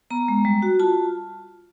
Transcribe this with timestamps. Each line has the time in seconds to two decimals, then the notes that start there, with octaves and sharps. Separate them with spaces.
0.10 B3 A#5
0.28 G#3
0.45 G3
0.62 F#4
0.80 F4 A5